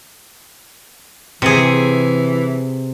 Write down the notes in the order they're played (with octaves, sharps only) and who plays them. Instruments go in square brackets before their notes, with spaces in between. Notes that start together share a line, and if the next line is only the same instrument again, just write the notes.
[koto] C3 G#4 [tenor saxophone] E3